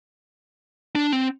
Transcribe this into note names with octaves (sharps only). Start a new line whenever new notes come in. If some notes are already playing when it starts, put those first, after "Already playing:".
D4
C4